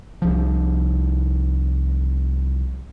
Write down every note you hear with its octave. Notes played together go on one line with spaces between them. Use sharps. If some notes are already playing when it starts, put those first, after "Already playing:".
C2 F3